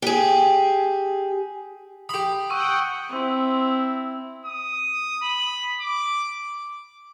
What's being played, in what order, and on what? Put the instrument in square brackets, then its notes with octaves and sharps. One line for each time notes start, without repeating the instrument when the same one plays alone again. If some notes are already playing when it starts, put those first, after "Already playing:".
[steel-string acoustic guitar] G4 G#4
[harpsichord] G4 B5 [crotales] D#6
[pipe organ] F#5 G5 [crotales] C#6 E6 D#7
[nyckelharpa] C4 E4
[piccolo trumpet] D#6
B5
D6